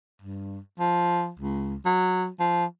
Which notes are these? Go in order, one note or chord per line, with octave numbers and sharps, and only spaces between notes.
G2
F3
C#2
F#3
F3